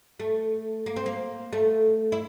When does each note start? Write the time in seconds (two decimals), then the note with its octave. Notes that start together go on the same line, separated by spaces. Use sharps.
0.20 A3
0.86 A#3
0.96 C4
1.06 A#3
1.53 A3
2.12 E4